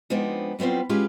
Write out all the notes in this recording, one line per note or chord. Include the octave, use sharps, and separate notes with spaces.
F3 G#3 B3 C4 D4 D#4
F#3 G3 B3 C4 F4
G#3 B3 C#4 F4 G4 G#4